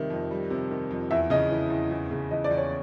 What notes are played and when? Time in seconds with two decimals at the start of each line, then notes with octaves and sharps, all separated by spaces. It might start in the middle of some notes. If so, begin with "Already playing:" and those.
Already playing: C3 D#3 G3 E5
0.10 F2
0.31 G3
0.50 C3
0.71 D#3
0.91 F2
1.11 E2 E5
1.30 C#3 D#5
1.51 E3
1.70 E2
1.91 E2
2.11 C#3
2.31 E3 D#5
2.44 D5
2.51 E2
2.58 C#5